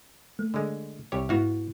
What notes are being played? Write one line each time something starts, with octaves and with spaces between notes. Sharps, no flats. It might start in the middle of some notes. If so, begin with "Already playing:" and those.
A3
D3 G#3
C2 G4 C#5
G#2 B3 E4 F#4 F5